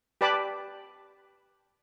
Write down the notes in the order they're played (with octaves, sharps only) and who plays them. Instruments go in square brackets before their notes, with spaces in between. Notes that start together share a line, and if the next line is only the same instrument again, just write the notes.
[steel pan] G4 B4 D5 A5 B5 D6